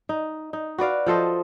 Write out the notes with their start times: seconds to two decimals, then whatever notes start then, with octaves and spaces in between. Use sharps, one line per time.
0.09 D#4
0.53 D#4
0.78 F#4 B4 D5 F5
1.06 F3 A4 C5 D#5